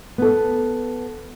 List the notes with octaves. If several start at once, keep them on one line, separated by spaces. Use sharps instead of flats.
B3 A4